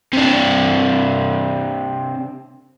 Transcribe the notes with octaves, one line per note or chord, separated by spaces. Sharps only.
C3 D4